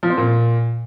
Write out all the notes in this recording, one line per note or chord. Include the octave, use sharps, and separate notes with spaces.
F3
C4
A#2